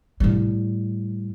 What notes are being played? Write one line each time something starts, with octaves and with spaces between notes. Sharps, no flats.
A2 G3